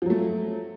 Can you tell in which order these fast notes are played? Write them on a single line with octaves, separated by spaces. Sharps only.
F3 F#3 A3